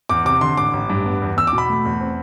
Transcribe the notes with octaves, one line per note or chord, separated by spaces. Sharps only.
E2 D6
C3 D6
D3 C6
A1 D6
A1
G2
B3
E2
E2 E6
D6
B2
B5
A3
E2
C4